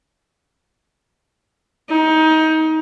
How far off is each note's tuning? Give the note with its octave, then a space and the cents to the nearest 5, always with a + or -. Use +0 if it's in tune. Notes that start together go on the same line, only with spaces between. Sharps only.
D#4 +25